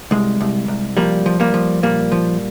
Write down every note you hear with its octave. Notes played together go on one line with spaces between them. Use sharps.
C2 G#3
C2
C2
F3 G3 A#3
F3
G3 A#3
F3
A#2 G3 A#3
F3